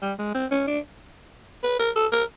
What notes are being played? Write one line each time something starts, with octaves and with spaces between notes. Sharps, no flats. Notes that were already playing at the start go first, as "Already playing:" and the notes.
G3
G#3
C4
C#4
D4
B4
A#4
A4
A#4